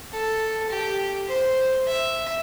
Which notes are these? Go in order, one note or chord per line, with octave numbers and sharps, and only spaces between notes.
A4
G4
C5
E5